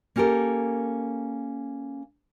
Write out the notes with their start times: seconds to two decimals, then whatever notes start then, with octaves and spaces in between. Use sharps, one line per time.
0.16 A#3 C#4 G4 A4 A#4